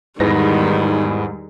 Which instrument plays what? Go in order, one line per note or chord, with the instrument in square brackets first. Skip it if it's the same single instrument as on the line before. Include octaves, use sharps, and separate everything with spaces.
[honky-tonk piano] E2 B4 A#6 [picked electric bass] G#2 [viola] D#3 G3